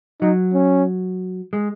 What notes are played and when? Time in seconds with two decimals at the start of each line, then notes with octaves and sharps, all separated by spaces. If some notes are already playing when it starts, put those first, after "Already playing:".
0.21 F#3 D#4
0.54 C#4
1.53 G#3